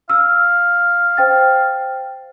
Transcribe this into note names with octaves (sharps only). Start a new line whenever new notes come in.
F5 E6
C5 G5 A6